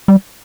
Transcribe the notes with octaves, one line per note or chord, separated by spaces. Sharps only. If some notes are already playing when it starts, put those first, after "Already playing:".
G3